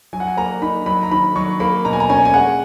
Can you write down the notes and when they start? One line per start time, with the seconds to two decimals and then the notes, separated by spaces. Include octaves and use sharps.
0.13 F#3 G#5
0.20 F#5
0.28 G#5
0.37 A#3 A#5
0.62 D#4 B5
0.86 F#3 B5
1.03 A#5
1.11 D#3 B5
1.36 F#3 C#6
1.60 A#3 B5
1.85 B2 A#5
1.93 G#5
2.00 A#5
2.09 C#4 G#5
2.25 G#5
2.34 G#3 F#5